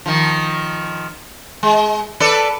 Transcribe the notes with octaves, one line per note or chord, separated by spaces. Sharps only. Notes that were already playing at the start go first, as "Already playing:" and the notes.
D#3 F3
G#3
A4 B4 D5